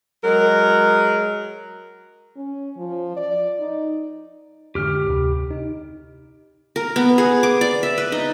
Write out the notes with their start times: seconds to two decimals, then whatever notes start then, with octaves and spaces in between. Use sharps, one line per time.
0.22 F#3 G#3 A#4
2.36 C#4
2.77 F3
3.16 D5
3.60 D#4
4.75 F2 G#2 D3 G4 F6
5.07 D2 C3
5.50 D#4
6.76 A#4
6.96 B3
7.18 G#4
7.43 D6
7.61 D5
7.83 E5
7.98 B4
8.12 D#4